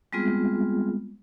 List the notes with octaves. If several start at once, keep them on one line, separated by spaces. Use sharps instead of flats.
G3 G#3 B3 C4 F4 G#4